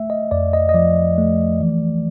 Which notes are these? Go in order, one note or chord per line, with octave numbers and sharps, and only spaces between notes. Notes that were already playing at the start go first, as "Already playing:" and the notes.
Already playing: A3 E5
D#5
F2 D5
D#5
D#5
F3 D5
A3
E3